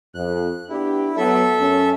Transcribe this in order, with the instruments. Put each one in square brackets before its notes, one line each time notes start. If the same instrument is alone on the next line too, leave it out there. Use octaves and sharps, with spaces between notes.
[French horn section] F2 [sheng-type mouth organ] F#6
[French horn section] B3 D4 G4 [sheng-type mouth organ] E4
[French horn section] F#3 B3 [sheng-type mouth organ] A4 E5
[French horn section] F#2 C#4